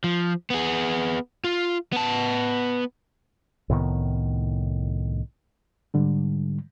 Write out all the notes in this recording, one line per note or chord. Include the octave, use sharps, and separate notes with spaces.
F3
B3 G#4
F4
B3 A5
C2 A2 D#3 B3
G#2 D3 G3